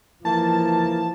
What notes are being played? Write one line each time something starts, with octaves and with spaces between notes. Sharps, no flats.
E3 F3 A#3 A5